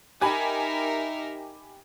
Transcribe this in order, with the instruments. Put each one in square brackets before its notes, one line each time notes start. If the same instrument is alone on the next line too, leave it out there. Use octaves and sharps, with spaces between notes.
[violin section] D#4 A#4 E5 [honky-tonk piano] G4 G#5 B5